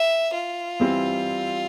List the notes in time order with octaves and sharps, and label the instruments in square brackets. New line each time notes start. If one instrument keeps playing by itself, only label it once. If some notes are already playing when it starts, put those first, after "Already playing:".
Already playing: [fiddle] E5
F4
[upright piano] E3 G3 C4 E4